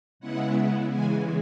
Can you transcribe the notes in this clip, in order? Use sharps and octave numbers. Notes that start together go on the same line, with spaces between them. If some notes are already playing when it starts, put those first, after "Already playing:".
C#3 G#3 B3 E4 F#5
C#3 E3 G#3 G#5